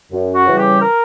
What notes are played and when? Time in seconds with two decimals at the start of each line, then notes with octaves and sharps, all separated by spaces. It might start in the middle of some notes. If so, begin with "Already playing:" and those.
0.12 F#2
0.35 F#4
0.47 C#3 E3 G3
0.58 G4
0.82 A#4